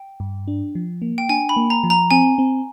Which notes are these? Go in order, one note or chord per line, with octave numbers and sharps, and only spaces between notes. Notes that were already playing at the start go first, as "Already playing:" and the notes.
Already playing: G5
G2
D4
F3
A#3
G5
D4 G#5
B5
A#3
A#5
F3
A#5
C4 G#5
C4